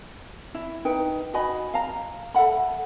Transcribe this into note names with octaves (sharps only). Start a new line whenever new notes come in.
E4
D#4 B4 G5
F#4 D#5 G#5 B5
F5 A#5
A4 E5 F#5 B5